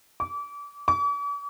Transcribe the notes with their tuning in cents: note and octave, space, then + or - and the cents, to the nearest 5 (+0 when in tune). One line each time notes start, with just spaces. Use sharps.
D6 -30
D6 -45